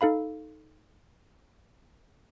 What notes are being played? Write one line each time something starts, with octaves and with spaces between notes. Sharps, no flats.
D#4 A4 F5 B5